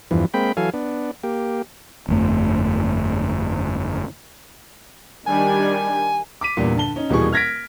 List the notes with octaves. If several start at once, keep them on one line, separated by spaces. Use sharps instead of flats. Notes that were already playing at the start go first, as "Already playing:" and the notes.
E2 G2 E3 F3
G#3 A#3 C4 G5 B5
E3 F#3 A4 F5 G#5
B3 D4
A#3 G4
G1 F2 A3
D#3 G3 D4 G#5
D6 B6 D#7
E2 G2 A#2 G3
D3 A5 G7
C#4 D#4
D#1 B2 E3 G3 G#4 C#6
F6 G#6 A#6 B6 D7